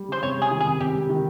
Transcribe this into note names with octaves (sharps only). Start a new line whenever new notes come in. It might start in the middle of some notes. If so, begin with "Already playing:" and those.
Already playing: G3
C#3 C5
C3 C#5
G3 G#4
D#3
G#4
C3
C3 G4
G3
D#3